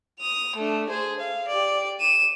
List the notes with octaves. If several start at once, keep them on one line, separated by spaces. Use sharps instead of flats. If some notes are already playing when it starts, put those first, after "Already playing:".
D#6 F7
A3 D4
G#4 C5
F5
G4 D5
D#7 E7